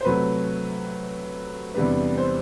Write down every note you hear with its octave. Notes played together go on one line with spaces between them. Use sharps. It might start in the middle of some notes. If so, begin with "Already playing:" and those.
C5
C3 F#3 A3 B4
E2 C3 G3 D4 B4
C5